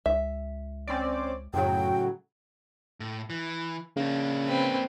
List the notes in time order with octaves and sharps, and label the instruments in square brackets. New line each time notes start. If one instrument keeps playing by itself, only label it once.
[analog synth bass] C#2 [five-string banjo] E5
[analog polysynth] C4 C#4 D5
[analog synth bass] F#2 [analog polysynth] A2 C#3 F#3 [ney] G5
[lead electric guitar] A2
E3
[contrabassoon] C#3 [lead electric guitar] A#3 D4
[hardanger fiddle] C4 B4